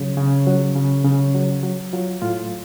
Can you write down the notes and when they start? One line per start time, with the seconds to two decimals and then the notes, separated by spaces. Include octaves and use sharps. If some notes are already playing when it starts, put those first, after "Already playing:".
Already playing: C#3 F#3
0.17 C#3
0.47 F#3
0.75 C#3
1.04 C#3
1.35 F#3
1.63 F#3
1.93 F#3 F4
2.22 A2 F4